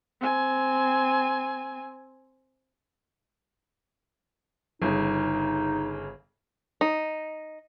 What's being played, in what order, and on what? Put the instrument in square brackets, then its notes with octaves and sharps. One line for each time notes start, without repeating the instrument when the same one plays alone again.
[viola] C4 G#5
[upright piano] G1 C#3 [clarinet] D#4
[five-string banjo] D#4